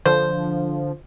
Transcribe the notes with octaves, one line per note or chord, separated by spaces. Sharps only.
D3 F3 C5